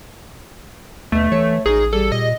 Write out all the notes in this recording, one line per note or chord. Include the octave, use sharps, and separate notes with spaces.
D#2 B2 D3 A3
E3 C#5 E5
A1 D#4 F#4 G#4 A#4
G3 G#4 A4
A#2 D#5